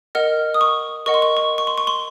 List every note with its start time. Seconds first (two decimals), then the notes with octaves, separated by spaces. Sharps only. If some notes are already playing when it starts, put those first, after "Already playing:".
0.15 A#4 D#5 F#5 F6
0.54 D#6
0.61 C#6
1.06 A#4 D#5 F#5 C#6
1.14 C6
1.22 C#6
1.37 C#6
1.58 C#6
1.67 C6
1.78 C#6
1.87 C6